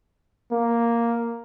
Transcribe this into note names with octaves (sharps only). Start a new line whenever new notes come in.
A#3